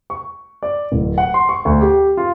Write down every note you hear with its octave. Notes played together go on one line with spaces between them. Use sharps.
C#6
D5
D1
F#5
C6
C#6
D2
G4
F4